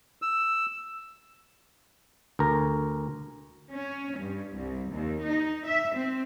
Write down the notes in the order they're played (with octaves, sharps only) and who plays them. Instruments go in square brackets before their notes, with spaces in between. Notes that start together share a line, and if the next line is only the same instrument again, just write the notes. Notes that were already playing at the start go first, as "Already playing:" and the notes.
[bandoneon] E6
[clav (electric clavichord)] D2 A#4
[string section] C#4
G2
C2
D#2
D#4
E5
C4